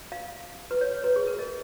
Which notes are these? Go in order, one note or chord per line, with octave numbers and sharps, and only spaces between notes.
F5
B4
C#5
B4
G#4
A#4
D#5